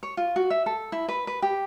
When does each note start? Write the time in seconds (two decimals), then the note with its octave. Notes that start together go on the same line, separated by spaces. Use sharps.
0.03 C#5
0.17 F4
0.36 F#4
0.50 E5
0.66 A4
0.92 E4
1.08 B4
1.27 B4
1.42 G4